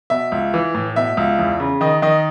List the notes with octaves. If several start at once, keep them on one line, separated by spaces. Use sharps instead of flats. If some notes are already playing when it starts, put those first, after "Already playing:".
B2 E5
C#2
E3
A2
B2 E5
C#2
E2
C#3
D#3 D#5
D#3 D#5